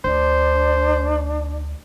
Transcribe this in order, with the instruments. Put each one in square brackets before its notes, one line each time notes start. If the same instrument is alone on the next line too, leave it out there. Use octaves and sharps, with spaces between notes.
[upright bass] D2 [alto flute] D4 [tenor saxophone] C5